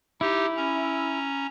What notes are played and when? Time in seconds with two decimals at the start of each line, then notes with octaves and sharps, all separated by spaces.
0.21 D#4 E4 G4
0.56 C#4 A#5